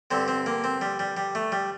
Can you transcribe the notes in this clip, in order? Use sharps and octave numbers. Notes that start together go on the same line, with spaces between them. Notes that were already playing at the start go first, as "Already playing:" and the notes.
G2 D3 C4
C4
A#3
C4
G3
G3
G3
A3
G3